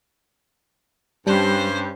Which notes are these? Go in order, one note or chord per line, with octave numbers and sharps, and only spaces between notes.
G2 G3 C#4 C5